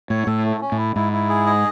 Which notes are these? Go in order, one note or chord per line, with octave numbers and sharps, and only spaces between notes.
A2 C#5
A2 A4
A3
C#4
A2
E4
G#2 E4
E4
G#4
D#5